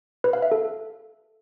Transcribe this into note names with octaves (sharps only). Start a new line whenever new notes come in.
B4
F5
E5
A4